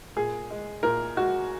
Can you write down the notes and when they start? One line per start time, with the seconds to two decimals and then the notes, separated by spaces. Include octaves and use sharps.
0.16 A#2 G#4
0.50 G#3
0.83 A#2 A#4
1.16 G#3 F#4